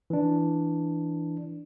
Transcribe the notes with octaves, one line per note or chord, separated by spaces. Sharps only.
E3 D4